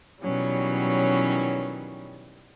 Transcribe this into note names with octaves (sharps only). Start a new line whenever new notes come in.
B2 D#3 E3 F#3 G3 C#4